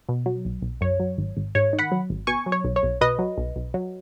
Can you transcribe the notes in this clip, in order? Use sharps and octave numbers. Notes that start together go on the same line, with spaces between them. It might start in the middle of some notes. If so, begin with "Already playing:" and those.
B2
F#3
B1
B1
F#2 C#5
F#3
G#1
G#1
G#2 C#5
D#3
F#5 B5
F#3
G#1
B2 G#5 C#6
F#3
C#5
B1
C#5
B1
B2 B4 D#5
F#3
B1
B1
F#3